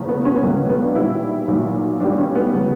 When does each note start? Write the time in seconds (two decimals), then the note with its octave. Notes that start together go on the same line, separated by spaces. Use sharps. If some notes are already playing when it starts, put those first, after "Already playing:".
Already playing: F#1 E2 C#3
0.08 B3
0.25 C#4
0.34 B3
0.43 C#2 B2 F#3 A#3
0.69 B3
0.82 D4
0.95 B1 A#2 G3 E4
1.48 B1 A#2 F#3
2.00 B1 B2 G3 D4
2.18 C#4
2.35 B3
2.53 C#3 F#3